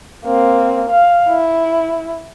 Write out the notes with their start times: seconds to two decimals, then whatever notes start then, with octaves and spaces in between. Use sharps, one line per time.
0.25 A#3 C4
0.90 F5
1.29 E4